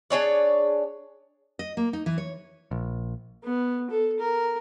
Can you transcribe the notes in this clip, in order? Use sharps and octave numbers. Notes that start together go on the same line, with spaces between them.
D4 G#4 C#5 D5
D#5
A#3
D#4
E3
C#5
A#1
B3
A4
A#4